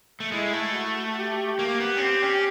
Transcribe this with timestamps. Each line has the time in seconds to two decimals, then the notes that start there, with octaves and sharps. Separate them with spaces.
0.20 A3
0.32 G#3 E4
0.53 A3
0.74 F#4
1.17 G4
1.59 A#3 G4
1.80 B3
1.97 C#4
2.01 C4 G4
2.23 C#4